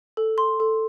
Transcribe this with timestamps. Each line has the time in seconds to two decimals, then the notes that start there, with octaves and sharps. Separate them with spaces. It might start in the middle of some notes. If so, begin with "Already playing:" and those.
0.17 A4
0.38 C6
0.60 A4